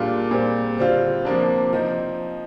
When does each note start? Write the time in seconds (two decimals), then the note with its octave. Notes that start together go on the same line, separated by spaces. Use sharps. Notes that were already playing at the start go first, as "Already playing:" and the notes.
Already playing: A#2 G3 D4 F4 G#4
0.08 A#4
0.31 A#2 G3 C4 C5
0.78 D3 G3 C4 F4 C5
1.25 C3 F3 A#3 D4
1.73 F3 C4 D#4 D#5